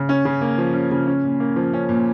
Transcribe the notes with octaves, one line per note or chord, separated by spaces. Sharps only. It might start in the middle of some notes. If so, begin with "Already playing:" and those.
Already playing: C#3
C#4
C#3
A#3
F3
C#4
C#3
C#4
A#2
A#3
F3
C#4
A#2